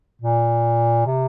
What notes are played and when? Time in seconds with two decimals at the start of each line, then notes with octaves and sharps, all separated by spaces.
0.21 A#2
1.06 C3